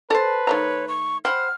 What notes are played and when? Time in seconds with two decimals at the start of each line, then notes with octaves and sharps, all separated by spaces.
0.10 A4 B4 C5 D5 A5
0.47 D#3 A3 C#5 A#5
0.88 C#6
1.25 C5 F#5 G5 B5 F6